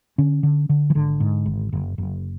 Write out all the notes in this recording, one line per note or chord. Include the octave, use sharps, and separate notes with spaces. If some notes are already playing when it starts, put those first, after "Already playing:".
D3 C#4
D3
D3
E3
G#1 D3
G#2
G#1
F#1
F#1